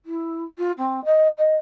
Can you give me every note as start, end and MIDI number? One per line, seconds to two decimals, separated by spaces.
0.05 0.44 64
0.58 0.72 65
0.78 1.04 60
1.05 1.28 75
1.38 1.55 75